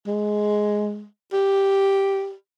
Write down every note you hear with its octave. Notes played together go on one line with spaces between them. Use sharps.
G#3
G4